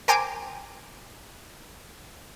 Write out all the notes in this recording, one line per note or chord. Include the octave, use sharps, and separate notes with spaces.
A#4 C5 G5 G#5 D6